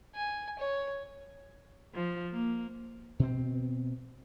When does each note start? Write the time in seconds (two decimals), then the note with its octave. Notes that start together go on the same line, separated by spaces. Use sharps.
0.16 G#5
0.59 C#5
1.95 F3
2.33 A#3
3.20 B2 C4